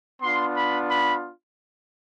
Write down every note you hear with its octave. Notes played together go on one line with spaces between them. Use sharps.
B3 D4 F4 C6
B5
B5